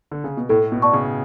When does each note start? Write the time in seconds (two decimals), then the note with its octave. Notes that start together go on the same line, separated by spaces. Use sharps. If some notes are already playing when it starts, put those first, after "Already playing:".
0.12 D3
0.24 C#3
0.37 B2
0.49 A2 A4
0.72 B2
0.82 D5 A5 C#6
0.93 C#3